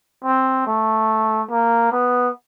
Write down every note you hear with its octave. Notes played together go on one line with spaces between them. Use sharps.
C4
A3
A#3
B3